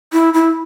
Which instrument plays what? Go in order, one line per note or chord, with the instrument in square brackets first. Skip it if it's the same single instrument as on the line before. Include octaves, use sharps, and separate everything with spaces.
[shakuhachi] E4
E4